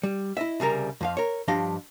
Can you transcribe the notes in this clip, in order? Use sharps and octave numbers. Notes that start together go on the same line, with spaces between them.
G3
E4 D#5 E5
C2 C#3 G3 A#4 A#5
F2 F3 F5
A#4 C#5
G2 F3 D4 G4 D#5 F5